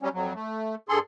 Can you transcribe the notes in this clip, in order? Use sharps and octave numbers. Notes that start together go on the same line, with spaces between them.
F#3 G3 C#4
F2 F#3
A3
G2 G#4 A4 C6